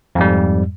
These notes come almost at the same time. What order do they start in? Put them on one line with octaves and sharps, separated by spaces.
F2 G#2 G3